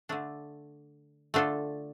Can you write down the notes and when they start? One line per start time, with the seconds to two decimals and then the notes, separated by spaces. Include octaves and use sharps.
0.09 D3 A3 D4
1.34 D3 A3 D4 F4 A4